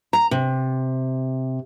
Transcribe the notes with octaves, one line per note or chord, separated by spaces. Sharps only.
A#5
C3